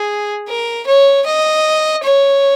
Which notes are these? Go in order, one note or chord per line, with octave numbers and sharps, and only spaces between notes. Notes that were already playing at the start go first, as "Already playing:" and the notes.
Already playing: G#4
A#4
C#5
D#5
C#5